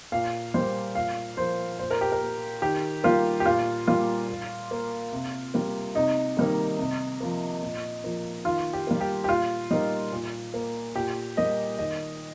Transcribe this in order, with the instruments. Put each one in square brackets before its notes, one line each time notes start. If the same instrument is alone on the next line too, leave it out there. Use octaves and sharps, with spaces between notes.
[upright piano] A#2 F5
G3 A#3 C5
A#2 F5
F3 A#3 C5
A#2 C5
A#4
G4
A#4
A#3
D#3 G4
G3 A#3 F4
G4
A#2 F4
G3 A#3 F4
A#2
A#3
C3
G3 A#3
C3 D#4
D#3 G3 A#3
C3
F3 A#3
A#2
F3 A#3
D#3 F4
G4
G3 A#3
G4
G4
A#2 F4
G3 A#3 D#4
A#2
A#3
A#2 G4
G3 A#3 D#5
D#3 D#5